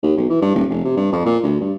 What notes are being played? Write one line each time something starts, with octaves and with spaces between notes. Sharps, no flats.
D#2
B1
E3
G2
D#1
F1
C3
G2
F2
A#2
D2
G2